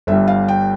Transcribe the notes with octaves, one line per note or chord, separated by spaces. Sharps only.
G1 G2 G3 E5
F5
G5